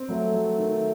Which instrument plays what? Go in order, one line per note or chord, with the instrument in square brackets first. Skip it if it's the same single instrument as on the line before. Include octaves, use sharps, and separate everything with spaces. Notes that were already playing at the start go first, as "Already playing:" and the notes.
Already playing: [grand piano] C4
[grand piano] F#3 [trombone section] A3
[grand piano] F#3
D#3